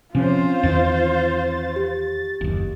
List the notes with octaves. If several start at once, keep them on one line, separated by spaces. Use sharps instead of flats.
C3 F3 C4 C#4 F4 C5
E2 D#3 E3 A6
G4
F#1 D#2